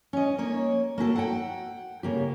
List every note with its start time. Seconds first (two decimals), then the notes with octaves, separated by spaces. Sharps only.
0.13 C#4 D#5
0.38 A#3 C#5
0.98 A#3 F#4 G4 A4
1.16 F#5 G5
2.03 C#3 A#3 G4